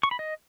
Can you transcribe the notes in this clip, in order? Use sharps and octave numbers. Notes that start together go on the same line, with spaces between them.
C#6
B5
D#5